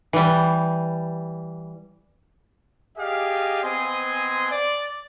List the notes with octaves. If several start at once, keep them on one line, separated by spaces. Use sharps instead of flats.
E3 G3
G4 G#4 D5 D#5 F5
B3 C4 D#5 G#5 C6
D5